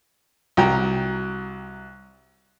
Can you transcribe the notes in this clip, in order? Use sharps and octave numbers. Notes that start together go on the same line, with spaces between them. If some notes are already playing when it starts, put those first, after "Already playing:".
C2 F#3 G5 A#5